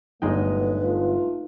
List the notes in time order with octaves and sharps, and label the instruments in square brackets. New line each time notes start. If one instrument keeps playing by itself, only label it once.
[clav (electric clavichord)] G1 G#3 G5 [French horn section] A#2 F#3 A3 [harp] D#4 [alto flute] B4
[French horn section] A3 F4